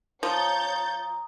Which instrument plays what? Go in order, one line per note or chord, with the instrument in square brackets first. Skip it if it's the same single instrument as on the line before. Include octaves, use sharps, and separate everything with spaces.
[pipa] F3 [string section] C#5 G6 A6 [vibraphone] A#5 D#6